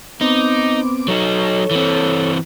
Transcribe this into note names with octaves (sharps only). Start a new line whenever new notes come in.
B3 C4 D#4 D6
F#3 D#4 A4 C#5
E3 C4